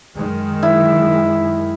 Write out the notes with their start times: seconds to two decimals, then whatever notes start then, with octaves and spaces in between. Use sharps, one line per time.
0.14 F#2 D#3 G#3
0.63 E4